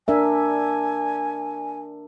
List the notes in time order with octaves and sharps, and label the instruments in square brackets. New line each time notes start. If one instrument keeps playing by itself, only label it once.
[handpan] D4 A#4 E5 [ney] G#5